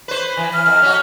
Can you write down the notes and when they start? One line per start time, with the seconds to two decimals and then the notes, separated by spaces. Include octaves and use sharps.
0.08 B4 C5
0.37 E3 G#5
0.53 F6
0.66 F2
0.82 C#4 F#4